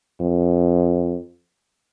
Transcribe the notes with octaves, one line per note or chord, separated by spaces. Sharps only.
F2